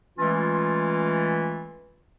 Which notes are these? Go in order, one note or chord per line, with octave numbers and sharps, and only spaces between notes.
E3 G#3 A3 C#4 F4